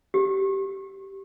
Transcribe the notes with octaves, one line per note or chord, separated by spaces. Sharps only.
G4